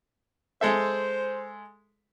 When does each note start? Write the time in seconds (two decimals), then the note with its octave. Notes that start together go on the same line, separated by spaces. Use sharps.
0.61 G#3 A4 C5 E5